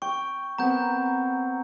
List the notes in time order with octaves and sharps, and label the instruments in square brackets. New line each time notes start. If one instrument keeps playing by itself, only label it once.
[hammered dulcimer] G5 [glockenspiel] C#6
[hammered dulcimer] B3 C4 A#4 [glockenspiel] A#5 G6